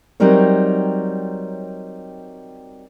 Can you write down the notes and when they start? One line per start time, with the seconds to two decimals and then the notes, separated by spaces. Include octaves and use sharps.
0.20 F#3 G3 C4 D#4 A#4 C#5